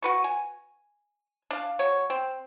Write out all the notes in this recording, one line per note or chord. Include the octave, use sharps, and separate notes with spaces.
F#4 B4 C#6
G#5
D4 F5
F#3 C#5
C4